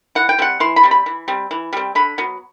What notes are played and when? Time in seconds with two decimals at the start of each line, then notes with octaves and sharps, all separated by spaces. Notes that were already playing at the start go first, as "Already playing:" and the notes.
0.15 E3 F#5
0.29 G5
0.39 G3 C4 F#5
0.60 E3 C6
0.76 B5
0.83 G3 C4
0.91 B5
1.06 E3
1.28 G3 C4
1.51 E3
1.73 G3 C4
1.95 D3 B5
2.18 F#3 B3